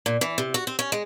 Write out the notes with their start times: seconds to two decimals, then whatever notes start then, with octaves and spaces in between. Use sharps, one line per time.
0.06 A#2
0.21 E3
0.38 C3
0.54 F#4
0.67 C4
0.79 C#4
0.92 G#3